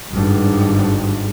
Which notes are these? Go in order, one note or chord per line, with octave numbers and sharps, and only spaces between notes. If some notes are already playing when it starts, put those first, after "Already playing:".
G#1 G2